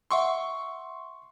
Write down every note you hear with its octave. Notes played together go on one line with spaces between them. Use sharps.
E5 F#5 C6 C#6 E6